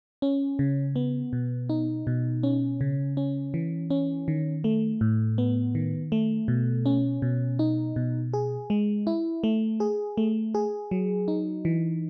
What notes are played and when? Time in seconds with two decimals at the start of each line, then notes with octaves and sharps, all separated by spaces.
0.22 C#4
0.59 C#3
0.96 B3
1.33 B2
1.69 D#4
2.07 B2
2.43 C#4
2.81 C#3
3.17 C#4
3.54 E3
3.90 C#4
4.28 D#3
4.64 A3
5.01 A2
5.38 B3
5.75 D#3
6.12 A3
6.48 B2
6.86 C#4
7.22 B2
7.59 D#4
7.96 B2
8.33 G#4
8.70 G#3
9.07 E4
9.44 A3
9.80 G#4
10.17 A3
10.55 G#4
10.91 F#3
11.28 D#4
11.65 E3